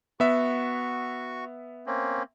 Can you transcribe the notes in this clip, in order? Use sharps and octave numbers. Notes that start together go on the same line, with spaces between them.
B3 F#4 E5 C#6
A#3 C4 C#4